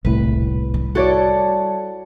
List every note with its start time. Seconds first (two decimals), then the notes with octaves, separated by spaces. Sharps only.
0.05 D#1 C2 A2 B4
0.74 G3
0.95 E4 F#4 A4 C#5 D5